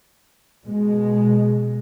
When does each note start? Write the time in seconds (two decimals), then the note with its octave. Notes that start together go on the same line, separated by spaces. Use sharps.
0.66 B2 G#3